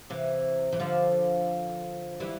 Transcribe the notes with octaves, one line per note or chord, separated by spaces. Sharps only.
C3 E3
E3
D3 F3
E3 G3